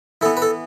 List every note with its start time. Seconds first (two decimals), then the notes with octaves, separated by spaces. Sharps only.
0.21 E3 A4
0.26 B3
0.37 B4
0.42 A4